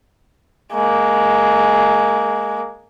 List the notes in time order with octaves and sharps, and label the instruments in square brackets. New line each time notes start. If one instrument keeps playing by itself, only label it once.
[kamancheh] G#3 A#3